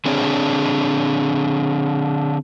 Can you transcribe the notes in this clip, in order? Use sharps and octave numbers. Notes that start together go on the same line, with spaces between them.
D3 C4 D4 G#4 C#5